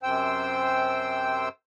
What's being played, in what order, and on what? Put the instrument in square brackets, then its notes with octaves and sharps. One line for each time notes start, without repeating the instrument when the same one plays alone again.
[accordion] F#2 C3 C5 G5 E6